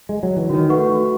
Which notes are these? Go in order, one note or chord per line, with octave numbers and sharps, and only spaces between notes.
G#3
F#3
E3
D#3 F#4
A3 B4 F#5 C#6
F#4